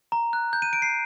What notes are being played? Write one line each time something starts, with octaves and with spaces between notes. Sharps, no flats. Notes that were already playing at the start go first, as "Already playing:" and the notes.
A#5
F#6
G6
D#7
D7
C7